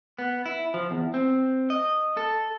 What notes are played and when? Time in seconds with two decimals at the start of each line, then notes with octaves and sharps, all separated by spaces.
0.19 B3
0.46 E4
0.74 F3
0.91 E2
1.14 C4
1.70 D#5
2.17 A4